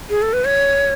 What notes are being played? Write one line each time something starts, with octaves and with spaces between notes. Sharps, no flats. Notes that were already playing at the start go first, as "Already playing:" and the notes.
G#4
A4
B4
C#5